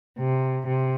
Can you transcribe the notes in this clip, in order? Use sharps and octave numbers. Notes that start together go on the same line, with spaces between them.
C3
C3